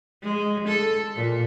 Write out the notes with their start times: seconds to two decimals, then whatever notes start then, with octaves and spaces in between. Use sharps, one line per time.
0.23 G#3
0.68 A4
1.15 A#2